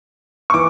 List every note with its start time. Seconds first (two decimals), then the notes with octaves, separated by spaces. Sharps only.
0.50 C#6
0.54 E3 D6